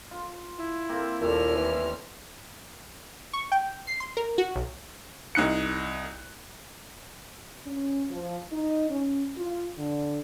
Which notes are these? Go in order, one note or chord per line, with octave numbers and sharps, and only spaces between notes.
F4
E4
A#3 C4
D#2 A#2 G3 A3 F6
E3
C#6
G5
C7
C6
A#4
F#4
B1
C2 D#4 F#6 C#7
C#4
F3
D#4
C#4
F4
D3